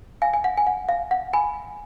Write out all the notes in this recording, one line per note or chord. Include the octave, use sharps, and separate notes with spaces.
F5 G#5
G#5
F#5
G#5
F#5
F5
F#5
G#5 B5